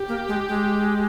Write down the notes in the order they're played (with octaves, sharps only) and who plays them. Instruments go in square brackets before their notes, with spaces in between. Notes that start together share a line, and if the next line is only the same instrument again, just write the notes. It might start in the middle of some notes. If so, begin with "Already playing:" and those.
Already playing: [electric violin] G4
[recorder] A#3
G#3
G#3